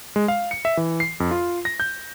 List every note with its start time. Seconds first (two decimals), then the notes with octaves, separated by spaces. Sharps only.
0.16 G#3
0.28 F5
0.51 C#7
0.65 E5
0.77 E3
1.00 C7
1.20 F2
1.31 F4
1.65 A#6
1.80 G6